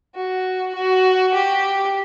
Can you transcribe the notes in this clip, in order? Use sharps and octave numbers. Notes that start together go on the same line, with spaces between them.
F#4
F#4
G4